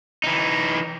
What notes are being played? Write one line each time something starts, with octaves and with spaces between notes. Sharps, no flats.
E3 D#4